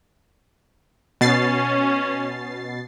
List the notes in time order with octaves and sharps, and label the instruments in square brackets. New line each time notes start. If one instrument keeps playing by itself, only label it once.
[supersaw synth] B2 A6 C7 [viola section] C#4